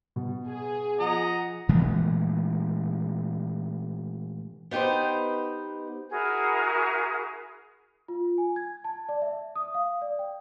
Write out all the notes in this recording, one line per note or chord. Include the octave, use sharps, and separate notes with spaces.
B2
G#4
F3 D#5 F#5 A#5
A#2 E3 G#3 A3
B3 D#4 G4 B4 C5
E4 F#4 G#4 A#4
F4
G#5
G#6
A5
D5
E5
D#6
F5
D5
G5